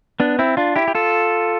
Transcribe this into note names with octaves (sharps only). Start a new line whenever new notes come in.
B3 D4
C4 E4
D4 F4
E4 G4
G4
F4 A4